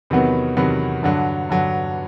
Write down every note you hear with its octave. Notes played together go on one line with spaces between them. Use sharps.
E2 C3 D#3 F#3 B3
E2 C3 D#3 F#3 B3
G2 D3 F#3
G2 D3 F#3